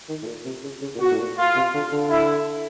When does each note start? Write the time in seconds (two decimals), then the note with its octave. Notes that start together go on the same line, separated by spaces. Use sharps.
0.09 D#3
0.23 A2
0.27 A#2
0.45 C3
0.63 C#3
0.82 C#3
0.95 A#2
1.00 B2 F#4
1.11 A2
1.19 A#2
1.37 F4
1.55 C3
1.74 D3
1.92 D3
2.10 E4